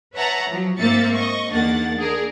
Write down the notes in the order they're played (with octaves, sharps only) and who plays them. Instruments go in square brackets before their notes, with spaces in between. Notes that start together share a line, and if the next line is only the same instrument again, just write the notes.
[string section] B4 C#5 E5 F#5 A5 A#5
F3 F#3
G#2 A#3 C4 E5 A6 C#7
D#5 C#6
E2 D#3 A#3 D4 F#5 A6
D4 G#4 A#4